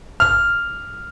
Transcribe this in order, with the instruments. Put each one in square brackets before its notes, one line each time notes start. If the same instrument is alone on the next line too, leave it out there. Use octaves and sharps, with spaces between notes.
[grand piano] F6